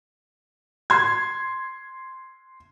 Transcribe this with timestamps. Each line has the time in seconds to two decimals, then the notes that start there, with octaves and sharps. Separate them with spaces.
0.90 C6 G#6